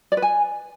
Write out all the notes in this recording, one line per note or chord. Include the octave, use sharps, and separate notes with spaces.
D5
B4
G#5